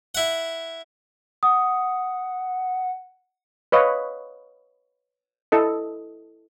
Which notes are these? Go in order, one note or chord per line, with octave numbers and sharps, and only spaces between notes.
E4 F#5
F#5 D#6
B4 C#5 D#5 F5
E4 A4 D#5